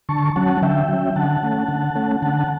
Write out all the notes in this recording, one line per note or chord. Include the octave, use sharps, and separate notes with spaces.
D3 A5 C#6
F#3 C#4 F#5 A5
D3 E5 G5
F#3 C#4
D3 F#5 A5
A3 C#4
D3
A3 C#4
D3 F#5 A5
A5